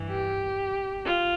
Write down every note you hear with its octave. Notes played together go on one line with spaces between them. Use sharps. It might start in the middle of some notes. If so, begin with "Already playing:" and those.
Already playing: G2 E3
G4
F4